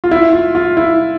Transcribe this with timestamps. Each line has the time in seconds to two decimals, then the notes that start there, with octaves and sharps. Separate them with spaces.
0.04 F4
0.11 E4
0.33 F4
0.55 F4
0.77 E4